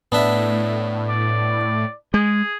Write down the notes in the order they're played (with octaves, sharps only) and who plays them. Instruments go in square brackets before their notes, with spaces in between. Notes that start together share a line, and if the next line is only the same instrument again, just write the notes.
[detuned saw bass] A2 [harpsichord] B3 D4 E5
[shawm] D5
[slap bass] G#3 [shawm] G#4